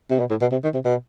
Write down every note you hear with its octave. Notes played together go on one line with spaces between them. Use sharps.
C3
B2
A2
B2
C3
D#3
C3
B2